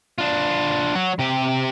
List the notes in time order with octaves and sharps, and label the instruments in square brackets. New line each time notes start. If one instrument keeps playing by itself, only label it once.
[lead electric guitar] D4 F4
F#3 F#4
C3 G4